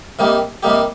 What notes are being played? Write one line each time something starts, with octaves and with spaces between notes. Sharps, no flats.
C3 G3 A#3 D#4 G4
C3 G3 A#3 D#4 G4